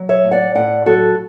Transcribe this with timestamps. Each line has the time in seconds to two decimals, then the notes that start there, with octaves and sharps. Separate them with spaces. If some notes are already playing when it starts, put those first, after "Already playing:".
Already playing: F#3
0.09 C#5 E5
0.24 A2
0.31 D5 F#5
0.55 A2 D5 F#5
0.86 F#3 F#4 A4